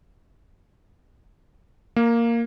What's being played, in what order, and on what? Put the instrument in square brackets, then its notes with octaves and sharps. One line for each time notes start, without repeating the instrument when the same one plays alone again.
[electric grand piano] A#3